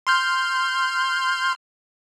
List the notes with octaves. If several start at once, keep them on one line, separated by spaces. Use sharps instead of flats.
C6 F6 G6